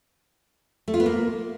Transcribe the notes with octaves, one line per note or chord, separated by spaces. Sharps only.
A3
F4
B3
A#3